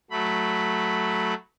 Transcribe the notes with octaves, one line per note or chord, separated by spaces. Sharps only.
F#3 A3 B5